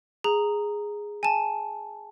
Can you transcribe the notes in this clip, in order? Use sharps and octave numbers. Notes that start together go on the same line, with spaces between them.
G#4 A#5
G#5 A5